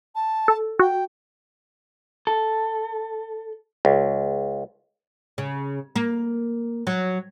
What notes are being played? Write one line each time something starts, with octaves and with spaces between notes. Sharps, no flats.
A5
A4
F#4 G5
A4
C#2
C#3
A#3
F#3